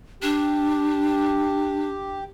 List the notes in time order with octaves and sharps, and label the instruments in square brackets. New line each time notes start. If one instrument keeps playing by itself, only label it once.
[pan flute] D4 [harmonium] G4